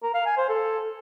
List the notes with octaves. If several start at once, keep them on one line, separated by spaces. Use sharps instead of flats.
A#4
F5
G#5
C5
A4